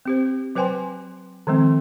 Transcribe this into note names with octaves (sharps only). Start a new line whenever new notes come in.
C4 G4 C5
F#3 B4 C5 G5 G#5 C6
D#3 F3 G#3 C4